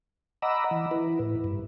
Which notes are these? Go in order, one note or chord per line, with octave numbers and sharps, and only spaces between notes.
D#5 F#5 A#5 B5 D6 E6
E3
E4 B4
A2
G2